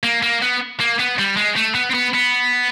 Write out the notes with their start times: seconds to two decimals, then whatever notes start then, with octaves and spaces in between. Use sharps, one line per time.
0.04 A#3
0.23 A#3
0.43 B3
0.80 A#3
0.99 B3
1.19 G3
1.37 G#3
1.56 A3
1.75 B3
1.90 C4
1.94 B3
2.14 B3